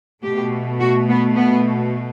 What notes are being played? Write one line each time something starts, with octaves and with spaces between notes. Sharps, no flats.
B2 A3 G4
F#4
B3
B3